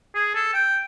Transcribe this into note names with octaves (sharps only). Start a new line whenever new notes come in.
G#4
A4
G5